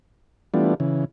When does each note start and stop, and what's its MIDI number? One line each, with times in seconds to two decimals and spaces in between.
0.54 0.74 52
0.54 0.74 55
0.54 0.74 57
0.54 0.74 59
0.54 0.74 62
0.54 0.74 65
0.80 1.05 49
0.80 1.05 52